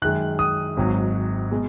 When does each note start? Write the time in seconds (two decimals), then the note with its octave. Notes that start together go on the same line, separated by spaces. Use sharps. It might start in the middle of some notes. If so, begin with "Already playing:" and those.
0.02 F#2 D#3 G#3 F#6
0.39 D#6
0.77 G#1 G#2 F#3
1.51 B2 G#3